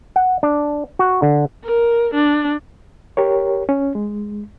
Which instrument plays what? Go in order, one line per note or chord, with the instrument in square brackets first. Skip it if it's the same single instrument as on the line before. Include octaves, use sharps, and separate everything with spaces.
[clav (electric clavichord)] F#5
D4
F#4
D3
[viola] A#4
D4
[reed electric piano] G4 A#4 C#5
C#4
G#3